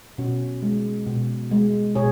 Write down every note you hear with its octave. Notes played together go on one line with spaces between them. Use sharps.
B2 C#4 F#4
G#3
B2
G#3
B2 G#4 C#5